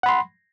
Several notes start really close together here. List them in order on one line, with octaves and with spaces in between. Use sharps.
F#5 B5 C6